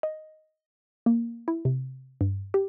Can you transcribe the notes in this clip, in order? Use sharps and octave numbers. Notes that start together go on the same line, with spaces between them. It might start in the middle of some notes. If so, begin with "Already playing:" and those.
D#5
A#3
E4
C3
G2
G4